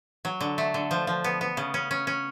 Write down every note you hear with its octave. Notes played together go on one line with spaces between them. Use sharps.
F#3
D3
A3
D3
F3
F3
B3
B3
C#3
C#4
C#4
C#4